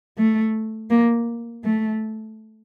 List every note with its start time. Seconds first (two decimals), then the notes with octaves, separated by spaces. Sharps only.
0.18 A3
0.90 A#3
1.64 A3